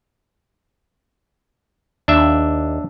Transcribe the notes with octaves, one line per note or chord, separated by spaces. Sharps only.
D#2 D4 E5